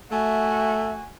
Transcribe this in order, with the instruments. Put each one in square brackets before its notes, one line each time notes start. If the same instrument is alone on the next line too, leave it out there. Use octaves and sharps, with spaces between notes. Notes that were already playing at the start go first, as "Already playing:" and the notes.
[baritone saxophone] A3 [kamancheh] F#4 G#5 [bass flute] E5